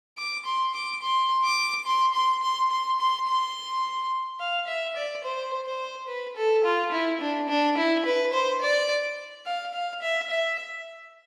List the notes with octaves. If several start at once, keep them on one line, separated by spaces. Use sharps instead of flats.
D6
C6
D6
C6
D6
C6
C6
C6
C6
C6
C6
F5
E5
D5
C5
C5
B4
A4
F4
E4
D4
D4
E4
B4
C5
D5
F5
F5
E5
E5